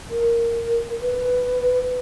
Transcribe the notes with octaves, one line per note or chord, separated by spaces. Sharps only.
A#4
B4